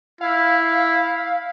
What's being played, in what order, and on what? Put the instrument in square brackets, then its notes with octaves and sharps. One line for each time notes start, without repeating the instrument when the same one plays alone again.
[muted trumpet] E4 [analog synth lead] F5